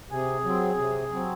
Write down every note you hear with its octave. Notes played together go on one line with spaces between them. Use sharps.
C3 G#4
F#3 C4
C3
F#3 C4